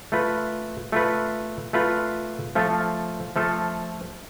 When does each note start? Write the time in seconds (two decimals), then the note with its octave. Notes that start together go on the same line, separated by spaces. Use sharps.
0.12 A3 F4 B4
0.92 A3 F4 B4
1.73 A3 F4 B4
2.55 F3 A3 F4 A4
3.36 F3 A3 F4 A4